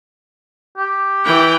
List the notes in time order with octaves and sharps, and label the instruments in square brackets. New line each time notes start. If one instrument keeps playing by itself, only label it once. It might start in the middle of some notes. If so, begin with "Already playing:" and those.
[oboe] G4
[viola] E3 G5